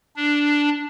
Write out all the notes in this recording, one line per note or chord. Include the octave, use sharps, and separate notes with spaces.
D4